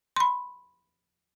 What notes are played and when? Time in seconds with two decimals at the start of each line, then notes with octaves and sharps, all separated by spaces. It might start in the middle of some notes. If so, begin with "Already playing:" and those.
0.16 B5 C6